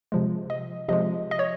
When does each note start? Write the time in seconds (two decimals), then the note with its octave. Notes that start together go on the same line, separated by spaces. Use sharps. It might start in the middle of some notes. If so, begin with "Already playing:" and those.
0.12 C3 F3 G#3
0.50 D#5
0.89 C3 F3 G#3 D#5
1.31 D#5
1.39 C#5